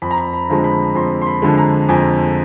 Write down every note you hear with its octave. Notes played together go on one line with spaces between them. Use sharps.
F2 B5
A#5
B5
B5
D3 F3 G#3
B5
F2 C6
C6
B5
D3 F3 G#3
A#5
F2 G#5